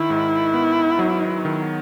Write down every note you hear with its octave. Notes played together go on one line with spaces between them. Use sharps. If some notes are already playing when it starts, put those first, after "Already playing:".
Already playing: D#3 E4
G#2
B3
F#3
D#3